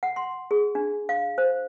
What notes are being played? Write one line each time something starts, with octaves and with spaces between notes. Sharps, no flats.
F#5
C6
G#4
D4
F5
C5